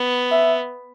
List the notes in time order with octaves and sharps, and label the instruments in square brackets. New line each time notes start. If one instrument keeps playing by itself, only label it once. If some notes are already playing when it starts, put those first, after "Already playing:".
Already playing: [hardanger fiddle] B3
[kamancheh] E5